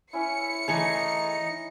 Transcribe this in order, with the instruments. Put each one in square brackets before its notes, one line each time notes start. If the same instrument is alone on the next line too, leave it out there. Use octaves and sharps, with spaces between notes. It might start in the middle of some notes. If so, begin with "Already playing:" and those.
[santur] C#4 E4 [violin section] C#7
[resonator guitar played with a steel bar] E3 A3 G#4 [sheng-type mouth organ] D#4